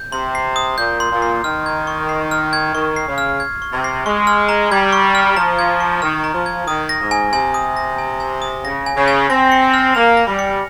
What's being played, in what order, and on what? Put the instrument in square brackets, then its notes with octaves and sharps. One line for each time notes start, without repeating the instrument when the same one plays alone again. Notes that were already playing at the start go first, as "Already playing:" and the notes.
Already playing: [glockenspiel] G6
[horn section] C3 [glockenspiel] C6
[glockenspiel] C7
D#6
[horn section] A#2 [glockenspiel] G6
[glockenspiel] C6
[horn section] A#2
[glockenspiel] C7
[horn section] D#3 [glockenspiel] F6
[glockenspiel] G#6
C#6
C7
F6
G#6
[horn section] D#3 [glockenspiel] C#6
[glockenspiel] C7
[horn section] C#3
[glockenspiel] F6
G#6
C#6
[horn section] C3
[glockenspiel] C7
[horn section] G#3 [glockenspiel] C#6
[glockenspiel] F6
A#5
[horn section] G3 [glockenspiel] G#6
[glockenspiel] C#6
F6
[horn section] F3 [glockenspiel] A#5
[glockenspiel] G#6
C#6
[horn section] D#3 [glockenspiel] F6
[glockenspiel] A#5
[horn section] F3
[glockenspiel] G#6
[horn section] D#3 [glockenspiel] D#6
[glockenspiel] A#6
[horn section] G#2
[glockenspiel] G#5
[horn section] C3 [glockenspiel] G#5
[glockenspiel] D#6
A#6
G#5
G#5
D#6
[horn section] C#3 [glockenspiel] A#6
[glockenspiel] G#5
[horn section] C#3
[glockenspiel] G#5
[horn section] C4 [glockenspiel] A#6
[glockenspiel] C#7
F6
[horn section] A#3 [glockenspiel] F7
[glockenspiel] A#6
[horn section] G3
[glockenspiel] C#7